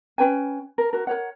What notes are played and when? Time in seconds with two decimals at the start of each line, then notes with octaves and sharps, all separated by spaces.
0.18 C#4 B4 G5 G#5
0.78 A#4
0.93 F#4 A#4
1.07 A#4 C#5 F#5